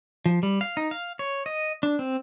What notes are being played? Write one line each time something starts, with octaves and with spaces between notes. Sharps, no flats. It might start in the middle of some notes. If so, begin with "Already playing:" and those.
F3
G3
F5
D#4
F5
C#5
D#5
D4
C4